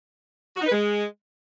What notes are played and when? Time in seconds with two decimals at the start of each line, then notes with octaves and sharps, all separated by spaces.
0.56 F#4
0.61 D#4
0.66 B4
0.71 G#3